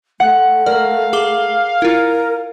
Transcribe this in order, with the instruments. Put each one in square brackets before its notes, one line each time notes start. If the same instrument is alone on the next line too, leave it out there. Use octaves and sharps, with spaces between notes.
[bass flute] A3 [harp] F#5
[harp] A#4 [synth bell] D5 [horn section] F5
[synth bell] G#4 D6 G7
[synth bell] E4 F4 [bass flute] A#4